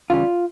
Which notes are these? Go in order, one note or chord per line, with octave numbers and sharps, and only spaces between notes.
E2 C#3 E3 G3 F4